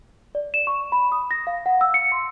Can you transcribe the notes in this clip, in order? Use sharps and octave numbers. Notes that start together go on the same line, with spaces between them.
D5
E7
C#6
B5
D#6
A#6
F5
F#5
E6
C#7
C6